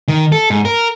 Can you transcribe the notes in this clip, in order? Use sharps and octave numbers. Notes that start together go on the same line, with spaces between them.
D#3
A4
G#2
A#4